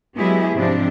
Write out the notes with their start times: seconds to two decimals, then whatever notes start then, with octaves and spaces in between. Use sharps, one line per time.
0.16 F#3 G#3 B3 E4 G4 G#4
0.54 G#2 C3 F3 C4 D4